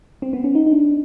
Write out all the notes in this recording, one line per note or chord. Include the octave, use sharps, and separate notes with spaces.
C4
B3
C#4
D#4
D#4
D4